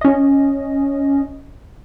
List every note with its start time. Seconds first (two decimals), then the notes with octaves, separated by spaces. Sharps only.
0.01 C#4 D#5